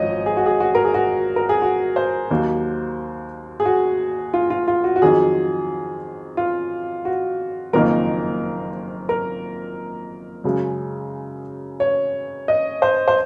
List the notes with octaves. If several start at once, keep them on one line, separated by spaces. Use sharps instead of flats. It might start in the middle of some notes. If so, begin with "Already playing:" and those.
Already playing: G#1 F#2 F3 C#5 D#5
G#4
F#4
G#4
F#4
A#4
G#4
F#4
A#4
G#4
F#4
C5
D#2 D#3 F#3 A#3
G#4
F#4
F4
F4
F4
F#4
F#4
F2 D#3 F#3 G#4
F4
F#4
F#1 F2 D#3 A#3 A#4
A#4
F#2 C#3 G#3
C#5
D#5
C5
C5